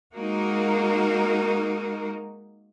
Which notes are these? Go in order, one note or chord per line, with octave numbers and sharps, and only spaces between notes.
G#3 A#3 D#4 F#4 A#4